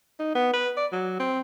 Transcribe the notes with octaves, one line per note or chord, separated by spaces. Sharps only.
D#4
B3
B4
D5
F#3
C4